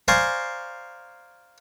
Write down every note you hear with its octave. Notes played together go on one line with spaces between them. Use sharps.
C5 D5 F5 G#5 A#5 C#6